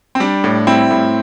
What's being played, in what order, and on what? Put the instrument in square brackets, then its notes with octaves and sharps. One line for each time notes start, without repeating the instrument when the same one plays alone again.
[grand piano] C4
G3 D4
A2
G3 C4 E4
A2